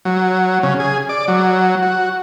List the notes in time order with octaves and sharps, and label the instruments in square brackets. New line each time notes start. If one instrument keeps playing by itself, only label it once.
[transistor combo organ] F#3
C#3
G#4
D5
F#3
F#4